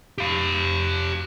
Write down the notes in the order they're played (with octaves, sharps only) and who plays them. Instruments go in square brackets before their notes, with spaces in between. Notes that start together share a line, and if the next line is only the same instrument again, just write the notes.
[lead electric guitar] G4 F5